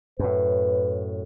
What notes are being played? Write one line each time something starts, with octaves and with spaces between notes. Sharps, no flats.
F#2 A2 B4